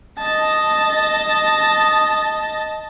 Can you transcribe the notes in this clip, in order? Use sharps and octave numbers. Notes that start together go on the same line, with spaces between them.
D#5 A5